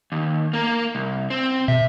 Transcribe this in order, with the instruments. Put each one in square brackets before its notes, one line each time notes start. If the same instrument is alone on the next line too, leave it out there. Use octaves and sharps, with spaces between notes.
[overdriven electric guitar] D#2
A#3 A#4
C2
C4
[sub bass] B2 [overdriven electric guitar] E5